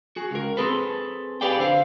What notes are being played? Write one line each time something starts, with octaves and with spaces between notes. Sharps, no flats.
F#4 G#4
C#2 A#4
C4 D#4 G#4 A4 B4
G4 G#4 B4 D5 F5 G5
D3 C5 F5